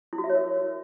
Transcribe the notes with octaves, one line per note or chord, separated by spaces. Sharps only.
E4
F#4
E5
C#5
A#4